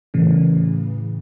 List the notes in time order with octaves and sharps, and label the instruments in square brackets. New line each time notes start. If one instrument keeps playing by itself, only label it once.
[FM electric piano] A2 C#3 E3